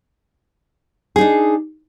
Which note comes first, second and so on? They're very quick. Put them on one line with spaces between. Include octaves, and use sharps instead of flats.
G#4 D#4 D4